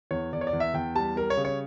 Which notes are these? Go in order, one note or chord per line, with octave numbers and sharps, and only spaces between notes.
E2 C#5
E2 D5
C#5
D5
E2
E5
E2 G5
G3 A5
G3 A#4
C#5
C#3
C#5